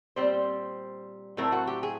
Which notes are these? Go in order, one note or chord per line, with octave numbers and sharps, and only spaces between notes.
A#2 G3 C4 C5
A2 F#3 A3 C4 A#4
F#4
G4
G#4